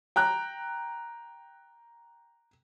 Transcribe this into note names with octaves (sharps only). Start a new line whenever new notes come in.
G5 A#5 F#6